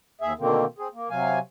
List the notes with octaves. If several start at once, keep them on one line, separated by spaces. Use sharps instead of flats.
D#2 G#4 E5
B2 D3 D#3 A#3 C4
C4 G#4
A#3
C3 F#3 F5 G#5